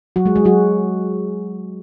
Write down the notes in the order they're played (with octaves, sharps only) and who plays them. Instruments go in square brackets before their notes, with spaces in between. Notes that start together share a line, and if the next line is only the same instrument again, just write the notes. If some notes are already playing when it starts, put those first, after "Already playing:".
[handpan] F#3 F#4
G#3 G#4
G#3 G#4
F#3 F#4